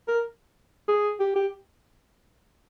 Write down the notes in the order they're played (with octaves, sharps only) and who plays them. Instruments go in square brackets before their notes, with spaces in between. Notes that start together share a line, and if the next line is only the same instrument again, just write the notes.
[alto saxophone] A#4
G#4
G4
G4